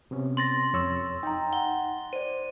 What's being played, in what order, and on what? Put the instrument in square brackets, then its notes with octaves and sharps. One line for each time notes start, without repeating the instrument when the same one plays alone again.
[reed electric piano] C3 B3 C#4
[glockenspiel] C6 A6 A#6
[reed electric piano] F2 C#5 E6
[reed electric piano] D#4 [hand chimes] G5 A#5
[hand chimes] F#5 [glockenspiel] G7
[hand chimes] C5 D5 [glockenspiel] D#7